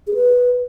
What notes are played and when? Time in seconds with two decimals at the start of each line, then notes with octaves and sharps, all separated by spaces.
0.07 G#4
0.14 B4